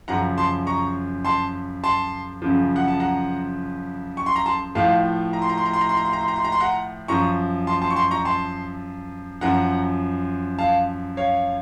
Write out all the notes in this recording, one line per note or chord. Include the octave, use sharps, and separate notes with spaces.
F#2 C#3 F3 F#5 A#5
A5 C6
A#5 C#6
A5 C6
A5 C6
F#2 C#3 F3
F#5
A5
F#5 A#5
C#6
C6
A#5
A5 C6
A2 F3 F5 A5
A#5
C6
A#5
C6
A#5
C6
A#5
C6
A#5
C6
A#5
C6
A#5
C6
A#5
C6
F#5 A#5
F#2 F3 A#5 C#6
A5 C6
A5 C6
C#6
A5 C6
A#5 C#6
A5 C6
F#2 F3 F#5 A#5
F5 A5
C#5 F5